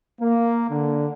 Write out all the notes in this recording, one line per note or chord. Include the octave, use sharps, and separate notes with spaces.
A#3
D3